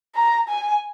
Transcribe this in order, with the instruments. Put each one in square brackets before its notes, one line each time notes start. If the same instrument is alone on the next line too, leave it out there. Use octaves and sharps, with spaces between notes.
[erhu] A#5
G#5